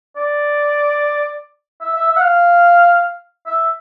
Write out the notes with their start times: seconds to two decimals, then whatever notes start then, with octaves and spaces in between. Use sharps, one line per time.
0.16 D5
1.81 E5
1.95 E5
2.09 E5
2.17 F#5
2.22 F5
3.46 E5